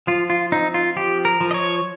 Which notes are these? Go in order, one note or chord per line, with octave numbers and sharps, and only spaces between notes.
F3 F4
F4
C4 D#4
F4
F3 G4
A#4
F3
D#5
C#5